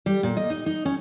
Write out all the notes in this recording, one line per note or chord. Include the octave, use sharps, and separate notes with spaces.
G3
A#2
D#5
D#4
D#4
C#4